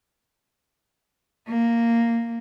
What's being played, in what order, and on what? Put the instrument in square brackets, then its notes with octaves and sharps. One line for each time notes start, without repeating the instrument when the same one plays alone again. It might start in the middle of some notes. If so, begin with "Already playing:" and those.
[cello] A#3